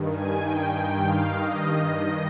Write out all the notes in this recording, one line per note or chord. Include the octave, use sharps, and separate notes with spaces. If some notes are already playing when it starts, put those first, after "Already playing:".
Already playing: G2 D#3
G#5
G5
G5
F5
D#5